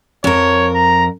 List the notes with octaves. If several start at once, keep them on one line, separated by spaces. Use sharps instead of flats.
F2 A#4 C#5
A#5